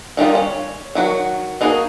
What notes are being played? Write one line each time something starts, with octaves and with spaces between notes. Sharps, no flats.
D#3 G3 D#4 F4
C#4
D#3 F#3 F#4
A#3 D#4 F#4 G#4